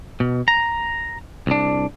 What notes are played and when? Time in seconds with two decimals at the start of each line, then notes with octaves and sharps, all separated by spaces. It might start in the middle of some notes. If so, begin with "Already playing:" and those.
0.20 B2
0.48 A#5
1.47 C2 D4